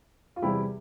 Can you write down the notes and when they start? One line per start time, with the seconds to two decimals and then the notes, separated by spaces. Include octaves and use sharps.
0.36 F4
0.42 E2 C3 G3 E4 G4